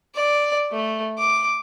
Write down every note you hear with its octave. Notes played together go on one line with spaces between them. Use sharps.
D5
A3
D6